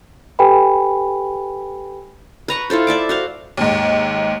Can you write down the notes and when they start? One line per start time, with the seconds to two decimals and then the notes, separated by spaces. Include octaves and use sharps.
0.39 G4 A4 B4 G5 G#5 B5
2.48 B4 A#5 C#6
2.70 E4 F4 A4 C5
2.87 D5 E5 A5 D6
3.09 F#4 C5 F5
3.57 D#2 G#2